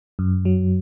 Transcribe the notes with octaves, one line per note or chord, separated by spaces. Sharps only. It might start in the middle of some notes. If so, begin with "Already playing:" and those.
F#2
F#3